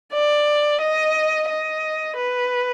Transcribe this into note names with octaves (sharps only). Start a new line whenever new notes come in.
D5
D#5
D#5
B4